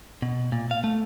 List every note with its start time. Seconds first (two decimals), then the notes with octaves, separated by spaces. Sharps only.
0.22 B2
0.52 A#2
0.71 F5
0.84 A3